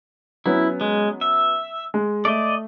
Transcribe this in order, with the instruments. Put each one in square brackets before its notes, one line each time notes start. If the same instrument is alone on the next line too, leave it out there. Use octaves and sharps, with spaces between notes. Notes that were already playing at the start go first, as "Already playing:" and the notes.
[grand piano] F#3 B3 C#4 [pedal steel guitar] E4
[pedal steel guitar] G#3
E5
[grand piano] G#3
[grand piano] A3 [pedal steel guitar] D5 D#5